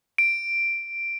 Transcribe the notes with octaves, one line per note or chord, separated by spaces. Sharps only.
D7